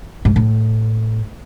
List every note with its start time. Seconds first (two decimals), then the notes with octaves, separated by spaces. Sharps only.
0.25 G#2
0.36 A2